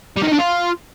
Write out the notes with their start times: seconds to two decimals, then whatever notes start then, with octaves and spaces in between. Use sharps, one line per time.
0.16 G3
0.22 D#3
0.27 D#4
0.33 D4
0.38 F4